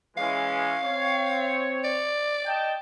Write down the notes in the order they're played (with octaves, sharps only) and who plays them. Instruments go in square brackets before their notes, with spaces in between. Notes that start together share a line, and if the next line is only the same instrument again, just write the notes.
[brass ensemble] E3 G#3 C#4 [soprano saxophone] F5
[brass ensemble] C4 C#5
[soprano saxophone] D5
[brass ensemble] D#5 G5 A5